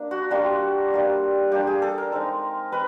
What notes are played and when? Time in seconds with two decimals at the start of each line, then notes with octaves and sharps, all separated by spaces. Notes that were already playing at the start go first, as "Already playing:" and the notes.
Already playing: A#3 D4
0.11 F#4
0.31 G3 A#3 D4 F4 F#4
0.91 G3 A#3 D4
1.51 G3 A#3 D4 G4
1.67 G#4
1.82 A4
1.98 A#4
2.12 G#3 C4 D#4
2.72 C4 D#4 B4